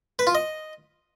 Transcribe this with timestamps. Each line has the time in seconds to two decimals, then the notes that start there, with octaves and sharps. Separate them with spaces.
0.19 B4
0.27 F4
0.35 D#5